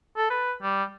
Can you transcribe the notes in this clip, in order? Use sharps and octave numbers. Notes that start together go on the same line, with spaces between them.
A4
B4
G3